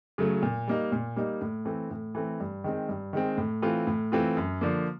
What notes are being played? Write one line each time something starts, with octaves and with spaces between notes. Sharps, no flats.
C#3 F#3 A3
A#2
G3 A#3 D#4
A#2
G3 A#3 D#4
A2
E3 A3 C4
A2
E3 A3 C4
G2
D#3 G#3 C4
G2
D#3 G#3 C4
A2
E3 A3 C4 F4
A2
E3 A3 C4 F4
F#2
D3 F3 A#3